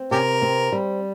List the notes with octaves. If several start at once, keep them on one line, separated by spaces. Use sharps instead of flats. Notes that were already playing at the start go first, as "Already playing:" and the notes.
Already playing: C4
C3 C#4 G4 A#4
C4
G3